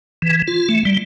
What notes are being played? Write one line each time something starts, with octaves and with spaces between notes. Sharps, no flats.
E3
F4
A3
G3